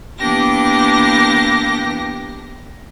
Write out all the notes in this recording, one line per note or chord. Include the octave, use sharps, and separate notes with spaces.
E3 A#3 B3 D4 G4 A#6